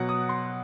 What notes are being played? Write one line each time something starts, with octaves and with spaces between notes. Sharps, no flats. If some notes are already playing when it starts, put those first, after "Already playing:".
Already playing: B2 F#3 F#5
D#6
C6